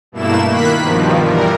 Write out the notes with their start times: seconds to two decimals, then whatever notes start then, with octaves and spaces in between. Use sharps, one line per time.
0.12 G2 B2 A3 A#3 E4 E7
0.46 D#3 A#3 B5 F#6 B6
0.82 G2 B2 D#3 F3
1.21 E3 G3 A#4